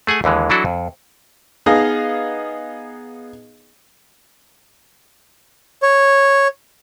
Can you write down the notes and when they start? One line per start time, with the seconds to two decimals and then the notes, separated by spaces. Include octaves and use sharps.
0.07 A3 G#4 F#5 G#5
0.24 D#2 D3 E3 G#3
0.50 E3 F#3 D4 E4 F#4 A4
0.65 F2
1.66 B3 D#4 G#4 D#5 F5
5.83 C#5